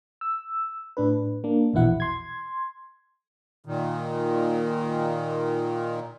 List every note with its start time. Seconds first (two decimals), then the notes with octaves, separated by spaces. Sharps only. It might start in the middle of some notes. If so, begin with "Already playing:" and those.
0.21 E6
0.97 A2 D4 B4
1.44 A#3 D4
1.73 A#1 E2 B2 E4 F#5
2.00 C6 G#6
3.65 A#2 D#3